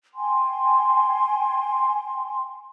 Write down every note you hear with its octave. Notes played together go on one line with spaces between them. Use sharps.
G5 G#5 C6